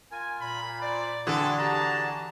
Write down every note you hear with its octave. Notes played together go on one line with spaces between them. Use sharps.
F4 A#4 G#5
A#2 B5
C5 D5
D3 E3 C4 D4 F#4 G#4 A4
G4 A5 A#5